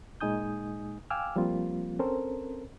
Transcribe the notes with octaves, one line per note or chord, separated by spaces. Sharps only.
A#2 G#3 D#4 G#5 D#6 G6
F5 G5 G#5 D6 E6 F6
F3 G3 A#3 C4 F4
C4 C#4 A4 A#4 C5